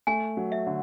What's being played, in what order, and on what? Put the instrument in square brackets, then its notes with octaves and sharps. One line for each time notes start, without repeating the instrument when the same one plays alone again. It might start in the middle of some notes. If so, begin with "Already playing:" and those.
[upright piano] A3 [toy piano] G#5
[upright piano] F#3
[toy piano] E5
[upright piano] D3